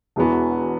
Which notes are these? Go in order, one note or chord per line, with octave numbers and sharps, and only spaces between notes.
E1 E2 E3 B3 F#4